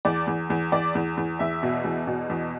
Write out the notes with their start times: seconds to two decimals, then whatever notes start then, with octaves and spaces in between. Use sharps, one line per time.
0.05 E2 D5
0.27 E2
0.50 E2
0.72 E2 D5
0.95 E2
1.17 E2
1.39 E2 E5
1.63 B2
1.84 E2
2.07 B2
2.30 E2